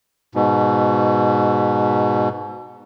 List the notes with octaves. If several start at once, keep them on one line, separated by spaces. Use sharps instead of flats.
G#2 B2